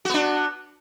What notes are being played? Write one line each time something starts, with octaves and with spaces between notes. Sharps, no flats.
B3 D4 F#4